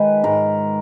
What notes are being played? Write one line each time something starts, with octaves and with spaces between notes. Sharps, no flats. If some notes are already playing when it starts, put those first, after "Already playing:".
Already playing: D#3 G#3 B4
G#2 A#4